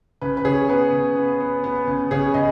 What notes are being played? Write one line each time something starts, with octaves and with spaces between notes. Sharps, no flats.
C#3 B4
B4
C#3 G#4 C#5
B3 B4
C#3
B3
B3
B3
C#3
C#3 G#4 C#5
C#3 D#5